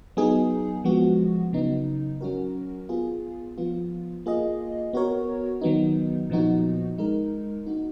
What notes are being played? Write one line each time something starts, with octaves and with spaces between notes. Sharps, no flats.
F#3 B3 D#4 G#4
F3 G#3 B3 F#4
C#3 F#3 B3 D#4
F#3 C#4 F#4 A#4
B3 F4 G#4
F3 B3 F4
A#3 F4 G#4 D#5
B3 F#4 A#4 C#5
D#3 F#3 B3 D#4
A#2 F3 B3 D#4 F#4
G#3 D#4 A#4
A#3 D#4 F#4